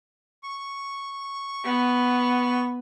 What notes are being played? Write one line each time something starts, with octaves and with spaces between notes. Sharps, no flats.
C#6
B3